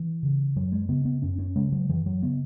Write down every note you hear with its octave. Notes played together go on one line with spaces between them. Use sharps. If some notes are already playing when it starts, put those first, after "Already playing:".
Already playing: E3
C#3
F#2 F#3
G#3
C#3 B3
B3
F#2 C#4
C#4
C#3 G#3
F#3
F#2 E3
F#3
C#3 B3